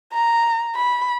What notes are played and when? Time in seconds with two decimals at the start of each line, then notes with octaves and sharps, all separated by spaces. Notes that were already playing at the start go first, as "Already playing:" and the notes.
0.13 A#5
0.75 B5